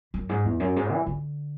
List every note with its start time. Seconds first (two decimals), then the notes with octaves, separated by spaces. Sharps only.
0.14 F#2
0.29 G#2
0.45 E2
0.60 F#2
0.76 G#2
0.92 E3
1.07 D3